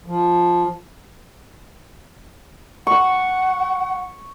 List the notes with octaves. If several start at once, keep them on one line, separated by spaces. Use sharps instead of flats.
F3
F#5 C#6